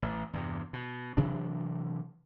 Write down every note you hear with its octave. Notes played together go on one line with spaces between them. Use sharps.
A1
E2 G2 C3
B2
C3 E3 F#3 D4